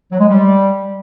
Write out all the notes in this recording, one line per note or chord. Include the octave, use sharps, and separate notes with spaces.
F#3
G#3
G3